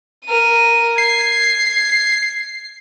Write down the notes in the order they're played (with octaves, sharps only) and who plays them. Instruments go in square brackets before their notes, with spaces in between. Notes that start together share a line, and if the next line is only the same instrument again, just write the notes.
[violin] A#4 D#7
[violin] G#6 [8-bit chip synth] C7